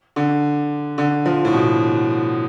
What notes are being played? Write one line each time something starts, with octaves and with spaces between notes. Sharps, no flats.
D3
D3
F3
A2
B2